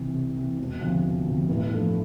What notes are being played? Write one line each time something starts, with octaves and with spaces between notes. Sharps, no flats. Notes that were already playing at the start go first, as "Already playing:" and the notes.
Already playing: C2 C3 E3
C2
C3 E3
E1
D2 C3 F3
E1
D2 C3 F3
A1
G2 F3 A3